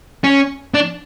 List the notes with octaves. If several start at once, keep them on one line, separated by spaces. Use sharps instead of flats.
C#4
D4